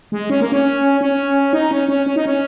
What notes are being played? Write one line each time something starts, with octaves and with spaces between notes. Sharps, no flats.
G#3
C#4
A#3
C#4
C#4
D#4
C#4
C#4
C#4
D#4
C#4